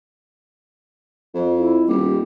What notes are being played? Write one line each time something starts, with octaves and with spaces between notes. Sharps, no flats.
F2
E4
D#1 G4